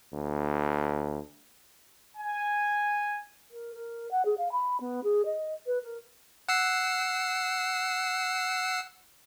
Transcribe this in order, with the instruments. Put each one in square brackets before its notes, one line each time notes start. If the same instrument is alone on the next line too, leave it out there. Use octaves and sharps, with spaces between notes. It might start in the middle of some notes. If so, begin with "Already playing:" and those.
[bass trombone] D2
[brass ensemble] G#5
[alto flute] A#4
A#4
F#5
G#4
F5
B5
B3
G#4
D#5
B4
A#4
[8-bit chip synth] F#5 E6 C7